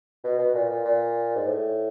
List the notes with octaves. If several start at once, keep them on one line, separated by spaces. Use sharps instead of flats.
B2
B2
A#2
A#2
A#2
G#2
A2